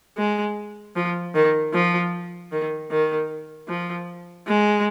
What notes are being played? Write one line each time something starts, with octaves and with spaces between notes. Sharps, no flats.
G#3
F3
D#3
F3
D#3
D#3
F3
G#3